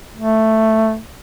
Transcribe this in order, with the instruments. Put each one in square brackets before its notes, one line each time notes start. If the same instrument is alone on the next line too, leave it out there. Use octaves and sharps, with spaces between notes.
[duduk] A3